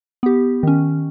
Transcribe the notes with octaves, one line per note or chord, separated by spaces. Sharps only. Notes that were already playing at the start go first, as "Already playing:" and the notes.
B3 G4
D#3 C#4